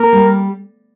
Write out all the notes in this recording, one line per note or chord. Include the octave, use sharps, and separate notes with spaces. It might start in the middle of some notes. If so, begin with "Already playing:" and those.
Already playing: A#3 A#4
G3